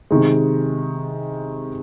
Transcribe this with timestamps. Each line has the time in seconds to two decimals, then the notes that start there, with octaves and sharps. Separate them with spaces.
0.11 C3 D#3 G#3